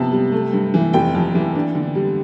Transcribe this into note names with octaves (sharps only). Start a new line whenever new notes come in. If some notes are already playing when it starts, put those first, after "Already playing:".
Already playing: C3 F3 B3 A5
G3
A3
G2
E3
F1 G5
F2
E3
D4
D3
G3